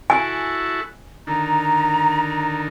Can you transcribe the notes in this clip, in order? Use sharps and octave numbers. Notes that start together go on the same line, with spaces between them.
E4 F#4 A4 G#5
D3 D#3 A#5